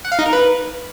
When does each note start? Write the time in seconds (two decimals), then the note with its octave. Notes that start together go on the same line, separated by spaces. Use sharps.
0.05 F#5
0.12 F5
0.19 D#4
0.26 A#4
0.33 B4